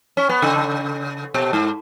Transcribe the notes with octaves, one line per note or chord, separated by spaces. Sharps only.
C#4
B3
C#3
B2
G#2